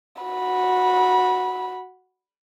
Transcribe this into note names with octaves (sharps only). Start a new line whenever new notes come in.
F#4 B5